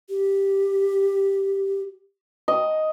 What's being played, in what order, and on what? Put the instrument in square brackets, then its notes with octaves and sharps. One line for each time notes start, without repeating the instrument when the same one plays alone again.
[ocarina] G4
[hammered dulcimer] D#5